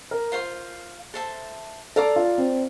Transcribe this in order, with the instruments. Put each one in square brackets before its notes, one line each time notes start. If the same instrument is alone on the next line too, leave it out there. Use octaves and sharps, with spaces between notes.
[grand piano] A#4
[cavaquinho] F4 C5 F5 C6
A4 C5 E5 A5
[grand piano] A4 [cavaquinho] D5 F5 A#5 D6
[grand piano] F4
C4